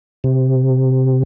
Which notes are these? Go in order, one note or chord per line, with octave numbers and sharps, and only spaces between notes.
C3